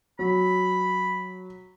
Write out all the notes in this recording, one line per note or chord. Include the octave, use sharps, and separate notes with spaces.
F#3 B5